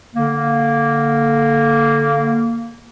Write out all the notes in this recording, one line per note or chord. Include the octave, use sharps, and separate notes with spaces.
D3 A#3